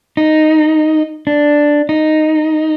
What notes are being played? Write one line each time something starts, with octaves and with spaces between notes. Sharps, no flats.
D#4
D4
D#4